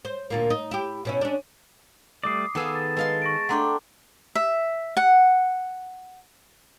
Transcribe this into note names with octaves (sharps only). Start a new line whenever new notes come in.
C5
D2 A#2 A#3
D#4
E4 G4
B2 C#4 E4
C#4 D4
G3 A3 D5 D6 D#6 C7
D#3 B3 G#4 A4 F5 E6
A5
G#3 B4 F5 C6
C#6 A#6 D7
A3 D4 F#5 G5 A#5 C6
E5
F#5